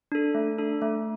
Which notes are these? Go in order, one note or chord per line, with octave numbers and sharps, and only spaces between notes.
D4 A4
A3
D4 A4
A3